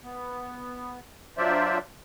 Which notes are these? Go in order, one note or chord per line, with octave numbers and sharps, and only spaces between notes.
B3
F#3 D4 F4 C5 D5 E5